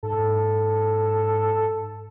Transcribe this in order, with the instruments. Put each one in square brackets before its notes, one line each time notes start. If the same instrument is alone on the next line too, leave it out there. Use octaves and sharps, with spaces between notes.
[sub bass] G#2 [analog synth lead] A4